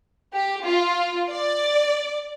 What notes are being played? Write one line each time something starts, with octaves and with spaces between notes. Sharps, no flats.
G4
F4
D5